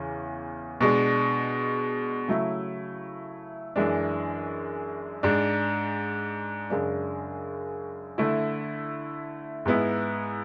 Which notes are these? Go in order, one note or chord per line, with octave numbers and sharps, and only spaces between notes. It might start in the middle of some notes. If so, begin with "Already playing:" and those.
Already playing: E2 C#3 E3 C#4
B2 G#3 D4
C#3 F#3 A3 E4
F#2 E3 G#3 D4
G#2 G#3 D4
F#2 C#3 G#3 D4
D3 A3 E4
G#2 G#3 B3 E4